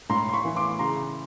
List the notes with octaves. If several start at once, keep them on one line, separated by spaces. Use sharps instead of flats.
A2 A#5 C6
C6
B5 C#6
E3
C6 D6
C#3 A#5 C6